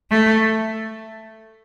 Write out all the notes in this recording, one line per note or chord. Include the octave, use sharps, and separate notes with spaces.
A3